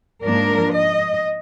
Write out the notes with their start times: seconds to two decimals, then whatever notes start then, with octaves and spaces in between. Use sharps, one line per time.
0.24 G#2 F3 A#3 D4 A#4
0.74 D#5